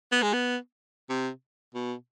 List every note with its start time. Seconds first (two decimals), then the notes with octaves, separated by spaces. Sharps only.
0.12 B3
0.22 G#3
0.33 B3
1.10 C3
1.74 B2